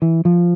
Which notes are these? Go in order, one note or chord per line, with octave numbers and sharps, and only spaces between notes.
E3
F3